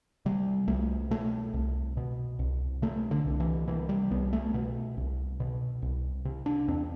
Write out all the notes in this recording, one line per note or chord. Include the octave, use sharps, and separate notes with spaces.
C3 G3
C2 A3
B2 A3
C2
B2
C2
C3 A3
D3
C2
E3
C3 E3
G3
C2 B3
A3
B2
C2
B2
C2
C3
D4
E2 C4